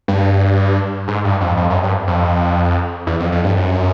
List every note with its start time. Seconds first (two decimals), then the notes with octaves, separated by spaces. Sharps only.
0.08 G2
1.08 G#2
1.24 G2
1.41 F2
1.57 F2
1.70 F#2
1.83 G2
2.07 F2
3.07 E2
3.20 F2
3.32 F2
3.44 G2
3.57 F#2